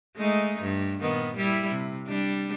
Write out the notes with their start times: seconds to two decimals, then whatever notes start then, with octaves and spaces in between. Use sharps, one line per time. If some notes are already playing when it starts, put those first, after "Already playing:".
0.17 G#3 A3 D#4
0.62 G2
1.00 A#2 D#3 B3
1.36 G3 E4
1.71 C3
2.08 G3 D4